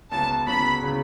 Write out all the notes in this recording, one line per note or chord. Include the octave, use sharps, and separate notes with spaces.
C#2 C#3 F#3 B3 A5
C#2 C#3 F#3 B3 B5
C#3 F#3 B3